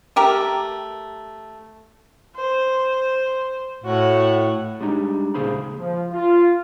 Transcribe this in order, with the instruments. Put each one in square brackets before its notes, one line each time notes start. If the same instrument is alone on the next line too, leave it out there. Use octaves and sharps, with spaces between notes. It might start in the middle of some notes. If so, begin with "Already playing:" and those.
[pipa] A3 G4 A#4
[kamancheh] C5
[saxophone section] A2 [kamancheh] F#4 F#5
[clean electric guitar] G3 G#3 D4 D#4
D2 A#2 C#3 G#4 C5 B5
[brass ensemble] F3
F4